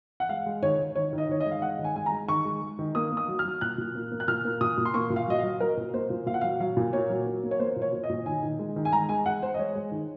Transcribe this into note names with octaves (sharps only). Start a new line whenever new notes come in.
F#5
G#3 F5
G#3
D#3 C#5
D#3
D#3 C#5
D#3
D#5
D#3 C#5
D#5
G#3
F5
G#3 F#5
D#3
G#5
G#3 G#5
A#5
G#3
D#3 C#6
G#3
G#3
D#3
A#3 D#6
A#3
D#6
F#3
F6
F#3
A#2 F#6
A#2
A#3
A#3
F#6
A#2 F6
A#3
A#2 D#6
A#2
C6
A#3 C#6
A#2
F5
F#3 D#5
F5
F#3
F#3 A#4
A#2
A#3 C5
A#2
A#2 F5
F#5
F#3 F5
F#3 F5
A#2
A#3 C#5
F#3
A#3
A#3
C#5
A#3 C5
A#2
C#5
A#2
D#5
A#2
D#3 G#5
D#3
G#3
D#3
G#5
G#3 A#5
G#3 G#5
G#3 F#5
G#3 C5
D#5
G#3 C#5
G#3
D#3